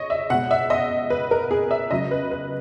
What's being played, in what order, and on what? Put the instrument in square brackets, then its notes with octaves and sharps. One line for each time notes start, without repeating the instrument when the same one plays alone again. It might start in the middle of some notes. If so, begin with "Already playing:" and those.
Already playing: [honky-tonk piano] C#5 D#5
E5
B2 G#3 F#5
E5
D#5
B4
A#4
G#4
E5
C#3 F#3 D#5
B4
B4